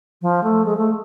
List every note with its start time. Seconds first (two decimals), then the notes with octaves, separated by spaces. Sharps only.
0.22 F3
0.43 A3
0.65 G#3
0.77 A3